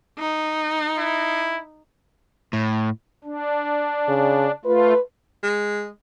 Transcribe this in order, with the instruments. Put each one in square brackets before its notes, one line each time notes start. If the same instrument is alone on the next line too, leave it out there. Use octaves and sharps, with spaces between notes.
[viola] D#4
[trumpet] E4
[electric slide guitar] A2
[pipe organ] D4
[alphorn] C#3
[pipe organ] A3 F4 [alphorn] B4
[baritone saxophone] G#3